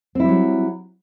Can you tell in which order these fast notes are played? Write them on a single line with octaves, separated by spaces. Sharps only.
C4 E4 G3 F#3